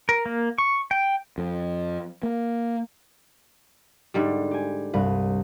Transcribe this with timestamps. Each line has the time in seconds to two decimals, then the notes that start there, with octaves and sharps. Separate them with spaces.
0.09 A#4
0.26 A#3
0.58 C#6
0.91 G5
1.38 F2
2.23 A#3
4.14 G#2 D3 G3
4.51 G4 G#5
4.94 C2 G2 B4